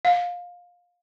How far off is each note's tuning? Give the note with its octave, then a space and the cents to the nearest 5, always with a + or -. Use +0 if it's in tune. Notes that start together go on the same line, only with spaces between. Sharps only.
F5 +20